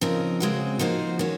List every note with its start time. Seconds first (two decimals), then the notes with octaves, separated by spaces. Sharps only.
0.01 C#3 F3 C4 D#4 A#4
0.40 C#3 G#3 C4 F#4
0.79 F3 A#3 D#4 F#4 C5
1.19 D#3 G#3 C#4 F#4